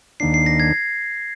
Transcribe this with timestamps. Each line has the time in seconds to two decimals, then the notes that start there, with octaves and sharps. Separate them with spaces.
0.20 D#2 D#3 A#3 D4 C7
0.34 C7
0.46 A#6
0.60 G#6